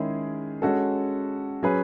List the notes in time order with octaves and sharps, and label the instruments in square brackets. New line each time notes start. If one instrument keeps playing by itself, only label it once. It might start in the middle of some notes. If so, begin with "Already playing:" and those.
Already playing: [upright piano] D#3 G#3 C#4 E4 G#4
G#3 C#4 F#4 A4
F#3 C#4 G#4 B4